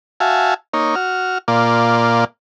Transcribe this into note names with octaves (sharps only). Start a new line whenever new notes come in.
F#4 E5 F5 G#5 A5
A#3 D#4 C#5
F#4 F6
A#2 A#3 F4 D5